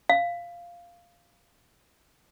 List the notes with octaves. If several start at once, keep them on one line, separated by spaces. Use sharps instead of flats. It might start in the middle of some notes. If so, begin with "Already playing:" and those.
F5